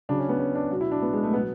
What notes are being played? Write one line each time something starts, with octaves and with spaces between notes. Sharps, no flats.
C#3 F#3 D4
C#4
B3
C#4
D4
B2 F#3 F#4
E4
D4
B3
G#3
A3
B2 F#3 B3